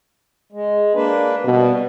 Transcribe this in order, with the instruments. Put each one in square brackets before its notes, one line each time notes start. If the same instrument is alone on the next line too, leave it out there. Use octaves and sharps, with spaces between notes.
[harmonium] G#3
A#3 D4 B4
[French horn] B2 [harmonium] G3